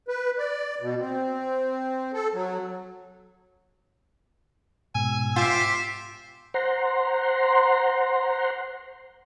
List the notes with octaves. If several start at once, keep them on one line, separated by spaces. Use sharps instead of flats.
B4
D5
B2
C4
A4
F#3
G#2 B2 G#5 E6
F4 G4 C5 E5
C5 F#5 A#5 C6